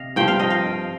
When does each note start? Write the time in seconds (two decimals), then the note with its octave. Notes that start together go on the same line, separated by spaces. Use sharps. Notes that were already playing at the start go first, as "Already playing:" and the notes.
Already playing: C3 D#5 F5
0.16 G2 F3 C4 G5
0.28 F5
0.39 D#5
0.50 F5